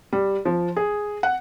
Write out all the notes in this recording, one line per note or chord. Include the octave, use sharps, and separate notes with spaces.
G3
F3
G#4
F#5